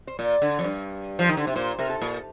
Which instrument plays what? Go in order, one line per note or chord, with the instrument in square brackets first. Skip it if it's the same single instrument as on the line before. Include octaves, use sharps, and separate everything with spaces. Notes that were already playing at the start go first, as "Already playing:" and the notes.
[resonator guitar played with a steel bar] C5
[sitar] A#2 [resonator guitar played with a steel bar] D5
[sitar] D3
F2
G2
F3
D#3
D3
C3
[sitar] A#2 [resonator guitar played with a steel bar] C5
[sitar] C3 [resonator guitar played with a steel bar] A#4
[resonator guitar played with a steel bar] A4
[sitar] A#2